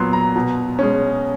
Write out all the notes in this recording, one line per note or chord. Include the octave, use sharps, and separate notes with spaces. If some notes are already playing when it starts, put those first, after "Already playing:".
Already playing: A#2 F#3 B3 C6
A#5
B2
G#3 C#4